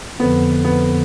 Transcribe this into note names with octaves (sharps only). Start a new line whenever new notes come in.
F2 D3 F3 B3
B3